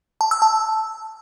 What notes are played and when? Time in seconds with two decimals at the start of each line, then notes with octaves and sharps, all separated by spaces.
0.21 A5
0.31 E6
0.42 A5